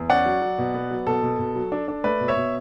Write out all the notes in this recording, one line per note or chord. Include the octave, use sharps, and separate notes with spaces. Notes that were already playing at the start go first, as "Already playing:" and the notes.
Already playing: E2
C#4 D5 F#5
F#3
F#3
B2
B3
F#3
B2 A4
B2
B2
F#3
D4
D4
A3 B4 D5
B2
C#5 E5
B2